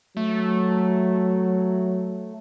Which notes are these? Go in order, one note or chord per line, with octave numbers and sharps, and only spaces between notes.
F#3 A3